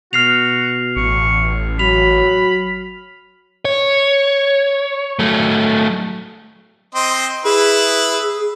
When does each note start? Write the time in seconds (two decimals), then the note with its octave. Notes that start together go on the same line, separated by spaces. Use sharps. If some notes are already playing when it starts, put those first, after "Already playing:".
0.13 B2 F#4 F6 C7 F7
0.96 A1 C#6
1.79 F#3 B5 F7
3.65 C#5
5.19 F#3 A3
6.95 C4 D#5 C6
7.45 E4 G#4 B4 E6